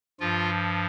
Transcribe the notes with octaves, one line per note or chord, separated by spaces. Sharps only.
G2 F3 F4